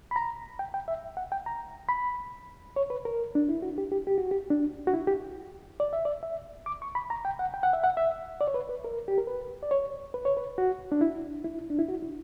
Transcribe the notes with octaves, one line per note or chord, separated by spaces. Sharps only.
B5
A#5
G5
G5
E5
F#5
G5
A#5
B5
C#5
B4
A#4
D4
E4
F#4
G4
G4
G4
F#4
G4
D4
F#4
E4
G4
D5
E5
D5
E5
D6
C#6
B5
A#5
G5
F#5
G5
F#5
E5
F#5
E5
D5
C#5
B4
B4
A#4
G4
A#4
B4
D5
C#5
B4
C#5
B4
F#4
D4
E4
E4
D4
E4
F#4
E4